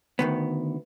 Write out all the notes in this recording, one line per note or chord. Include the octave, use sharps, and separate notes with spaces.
D2 D#3 B3